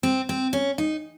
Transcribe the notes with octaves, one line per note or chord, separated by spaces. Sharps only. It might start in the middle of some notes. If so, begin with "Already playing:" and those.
C4
C4
C#4
D#4